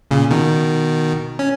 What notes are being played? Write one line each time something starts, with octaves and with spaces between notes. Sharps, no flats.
A#2 C#3
B2 D#3
C#4